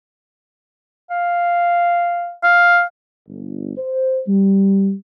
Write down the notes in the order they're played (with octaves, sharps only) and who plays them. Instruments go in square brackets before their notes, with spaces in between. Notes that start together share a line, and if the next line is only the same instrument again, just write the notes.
[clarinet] F5
[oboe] F5
[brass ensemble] G1
C5
G3